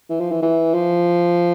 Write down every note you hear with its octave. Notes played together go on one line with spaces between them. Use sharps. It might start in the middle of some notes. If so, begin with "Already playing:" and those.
E3
F3
E3
E3
F3